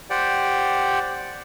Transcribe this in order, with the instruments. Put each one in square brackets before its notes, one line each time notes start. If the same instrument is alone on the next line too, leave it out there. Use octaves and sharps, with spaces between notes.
[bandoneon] G4 C5 D5 F#5 G5